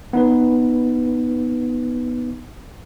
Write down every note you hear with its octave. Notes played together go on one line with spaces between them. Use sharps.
B3 D#4 B4